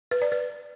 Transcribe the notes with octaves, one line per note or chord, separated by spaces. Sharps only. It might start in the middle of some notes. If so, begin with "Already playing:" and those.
B4
D5
B4